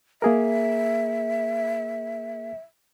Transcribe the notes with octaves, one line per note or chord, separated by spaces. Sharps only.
A#3 G#4 A#4 E5